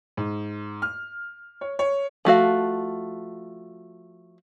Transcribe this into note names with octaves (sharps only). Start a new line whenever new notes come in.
G#2
F6
C#5
C#5
F3 A3 F#4 F5